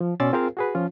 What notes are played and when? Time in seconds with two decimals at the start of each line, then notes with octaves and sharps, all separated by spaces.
0.01 F3
0.20 B2 C#4 D5 C6 E6 A6
0.33 C4 F4 G#4 A#4 C5 F5
0.57 F#4 G#4 B4
0.75 F3 C#4 F4